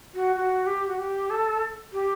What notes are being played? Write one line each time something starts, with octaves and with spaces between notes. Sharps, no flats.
F#4
F#4
G4
F#4
G4
A4
G4